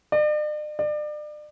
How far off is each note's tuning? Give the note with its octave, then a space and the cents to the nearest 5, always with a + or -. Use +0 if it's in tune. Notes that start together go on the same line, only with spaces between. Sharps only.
D5 +45
D5 +35